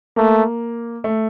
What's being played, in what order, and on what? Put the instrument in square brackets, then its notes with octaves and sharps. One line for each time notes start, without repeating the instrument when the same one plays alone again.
[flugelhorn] A3 [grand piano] A#3
[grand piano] A3